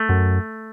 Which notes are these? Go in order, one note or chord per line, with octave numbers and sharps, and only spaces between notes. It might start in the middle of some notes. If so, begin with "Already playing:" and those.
Already playing: A3
F#2